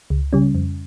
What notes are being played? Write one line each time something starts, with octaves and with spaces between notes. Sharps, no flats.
C#2
C#3 G3 C#4
F2